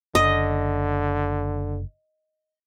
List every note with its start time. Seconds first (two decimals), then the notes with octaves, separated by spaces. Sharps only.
0.15 F#1 D3 D#5